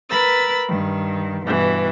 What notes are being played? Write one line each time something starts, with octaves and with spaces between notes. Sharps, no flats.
A#4 B4 B5 E6 A6
G2 D#3
G2 B2 E3